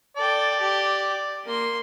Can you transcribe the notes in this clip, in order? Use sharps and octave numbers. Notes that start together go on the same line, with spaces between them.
A4 D5 G5
G4
A#3 C6